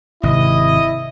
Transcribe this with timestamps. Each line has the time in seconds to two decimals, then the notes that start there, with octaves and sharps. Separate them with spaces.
0.23 G#1 C3 E4 D#5